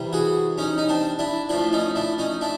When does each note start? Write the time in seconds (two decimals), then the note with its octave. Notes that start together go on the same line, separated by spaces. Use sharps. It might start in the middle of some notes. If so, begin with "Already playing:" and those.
Already playing: C3 E3 G3
0.13 F#4 G#4
0.58 C#4 D#4
0.78 D#4
0.89 C4 D4
1.19 D4 E4
1.49 A2 F3 D4 E4
1.73 C#4 D#4
1.96 D4 E4
2.18 C#4 D#4
2.41 D4 E4